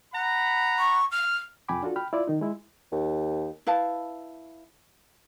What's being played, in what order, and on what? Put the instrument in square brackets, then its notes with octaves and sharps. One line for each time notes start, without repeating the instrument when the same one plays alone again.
[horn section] F#5 A#5 B5
[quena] C#6
F6
[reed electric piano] C2 F2 G5 G#5 B5 D6
D4 F4 F#4 A4
G5 B5 F6
E4 F4 D5
D#3 D#4
G#3 E4
[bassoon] D#2
[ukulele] E4 B4 F5 A5